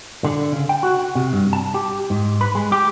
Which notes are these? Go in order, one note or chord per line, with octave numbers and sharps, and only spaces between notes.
D3
C#3
G5
F#4
C3
G2
A5
G4
G#2
B4
G#3
G4